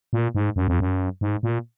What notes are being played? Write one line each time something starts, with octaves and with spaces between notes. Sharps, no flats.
A#2
G#2
F#2
F2
F#2
G#2
A#2